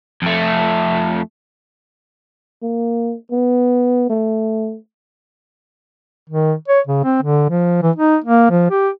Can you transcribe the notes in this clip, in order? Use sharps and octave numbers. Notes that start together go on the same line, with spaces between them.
F2 A3
A#3
B3
A3
D#3
C#5
C#3
C4
D3
F3
E3
D#4
A#3
F3
G4